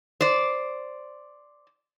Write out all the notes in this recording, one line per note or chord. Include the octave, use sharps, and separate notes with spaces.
C5 D5